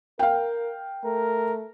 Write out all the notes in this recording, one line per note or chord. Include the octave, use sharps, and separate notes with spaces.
A#4 F5 G5
A3 A#4